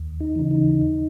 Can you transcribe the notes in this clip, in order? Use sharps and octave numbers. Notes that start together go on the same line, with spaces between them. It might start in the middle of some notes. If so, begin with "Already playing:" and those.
Already playing: D#2
D#4
C#3 E3
D#4
D#2